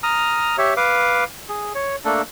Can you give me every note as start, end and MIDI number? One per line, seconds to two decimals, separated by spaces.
0.03 0.56 82
0.03 0.56 87
0.03 0.56 89
0.58 0.74 67
0.58 0.74 73
0.58 0.74 76
0.77 1.24 71
0.77 1.24 77
0.77 1.24 86
1.49 1.73 68
1.75 1.96 73
2.05 2.22 57
2.05 2.22 58
2.05 2.22 62
2.05 2.22 69